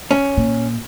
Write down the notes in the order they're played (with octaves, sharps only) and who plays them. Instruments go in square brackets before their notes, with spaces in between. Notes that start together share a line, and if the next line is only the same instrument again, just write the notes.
[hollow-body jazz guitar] C#4
[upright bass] A#2